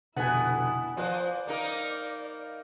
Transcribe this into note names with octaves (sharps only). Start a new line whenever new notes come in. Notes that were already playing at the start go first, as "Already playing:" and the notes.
F1 B2 D3 B3 E4 F#5 G#5
F3 B4 C5 D5 F#6
A#3 D#4 A#4